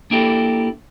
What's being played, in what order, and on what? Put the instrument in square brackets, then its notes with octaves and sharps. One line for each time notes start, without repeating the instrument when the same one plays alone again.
[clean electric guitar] A#3 D4 E4 G4 A4 A#4